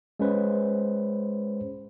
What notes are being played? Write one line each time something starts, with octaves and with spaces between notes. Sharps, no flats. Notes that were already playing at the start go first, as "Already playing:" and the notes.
G#3 C#4 B4 C5